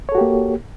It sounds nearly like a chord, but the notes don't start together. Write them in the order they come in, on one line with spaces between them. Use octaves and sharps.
C#5 A4 F#4 G4 A#3